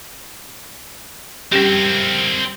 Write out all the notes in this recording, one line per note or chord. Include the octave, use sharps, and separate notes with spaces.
G3 C4 C#4 G4 A#4